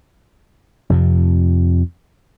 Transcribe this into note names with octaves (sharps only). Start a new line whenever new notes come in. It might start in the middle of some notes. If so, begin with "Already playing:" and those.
F2 C3 F3